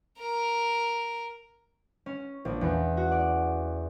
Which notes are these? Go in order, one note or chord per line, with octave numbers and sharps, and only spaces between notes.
A#4
C#4
A#1
E2
F#4
D5